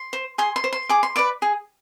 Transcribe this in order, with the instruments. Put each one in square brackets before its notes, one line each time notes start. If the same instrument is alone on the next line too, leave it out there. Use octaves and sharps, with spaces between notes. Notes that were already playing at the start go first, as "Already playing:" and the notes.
Already playing: [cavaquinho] C6
C5
G#4 C6
C6
C5
C6
G#4 D6
C6
B4 D5 D6
G#4